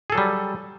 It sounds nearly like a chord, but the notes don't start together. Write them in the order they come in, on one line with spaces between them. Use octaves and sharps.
G#4 A4 F#3 G3